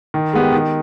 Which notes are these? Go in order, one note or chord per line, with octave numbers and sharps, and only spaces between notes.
D#3
G#3 B3 G4
D#3